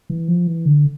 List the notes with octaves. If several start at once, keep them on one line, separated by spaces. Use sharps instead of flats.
E3
F3
E3
D3